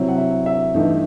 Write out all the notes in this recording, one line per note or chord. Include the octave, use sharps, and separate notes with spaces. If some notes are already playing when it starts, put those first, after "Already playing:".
Already playing: C3 F#3 C4 E4
F#5
E5
E5
G2 E3 A3 D#4